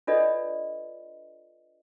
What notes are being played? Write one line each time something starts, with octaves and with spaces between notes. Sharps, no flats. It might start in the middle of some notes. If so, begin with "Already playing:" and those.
D4 F4 A4 B4 D5 D#5